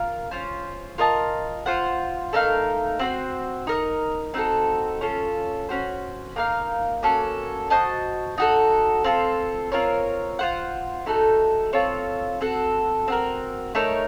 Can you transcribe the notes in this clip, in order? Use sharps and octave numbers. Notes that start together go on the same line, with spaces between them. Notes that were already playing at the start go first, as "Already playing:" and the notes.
Already playing: F4 A#4 F5
C#4 F4 C5
F4 A#4 D#5 A5
F4 C5 F#5
A3 D#4 A#4 F5
C4 F#4 C5
D#4 A#4 D#5
C4 D#4 F#4 A4
C#4 F4 A4
C#4 F#4 C5
A#3 D#4 A#4 F5
A#3 C#4 F#4 A4
F#4 C5 D#5 A5
D#4 F#4 A4
C4 F4 A4
C4 F4 A#4 C#5
F4 C5 F#5
A3 D#4 F#4 A4
C4 F4 A4 C#5
C4 F#4 A4
C4 F#4 A#4
A3 D#4 A#4 C#5